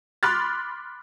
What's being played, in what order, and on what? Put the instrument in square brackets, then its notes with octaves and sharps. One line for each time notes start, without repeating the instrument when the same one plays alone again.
[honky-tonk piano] B5 C6 D6 F6 F#6 A6